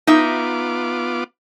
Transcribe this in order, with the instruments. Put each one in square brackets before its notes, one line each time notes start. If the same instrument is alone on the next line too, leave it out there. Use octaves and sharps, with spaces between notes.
[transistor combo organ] B3 F4 D6 [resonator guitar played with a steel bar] D#4 E5